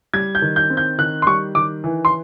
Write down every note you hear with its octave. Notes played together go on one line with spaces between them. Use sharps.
G3 G#6
G6
D#3
G6
C4
G6
D#3 F#6
C6
G3 C#6
D#3 D6
E3
C6